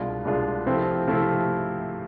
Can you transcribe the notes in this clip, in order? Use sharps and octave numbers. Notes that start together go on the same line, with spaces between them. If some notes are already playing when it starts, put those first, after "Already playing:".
Already playing: C2 B2 G#3 D4 F4
C2 B2 G#3 D4 F4
C3 F3 A3 C4 E4
C3 F3 A3 C4 E4